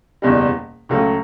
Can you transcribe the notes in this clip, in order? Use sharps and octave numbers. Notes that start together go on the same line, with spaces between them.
F#1 E2 B2 G3
C#2 C#3 F#3 A3